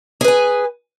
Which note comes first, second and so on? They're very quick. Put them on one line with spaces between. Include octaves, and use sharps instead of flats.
G#4 B4 G#5